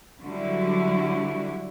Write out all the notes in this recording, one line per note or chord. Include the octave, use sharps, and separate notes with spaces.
D3 F#3 G3 E4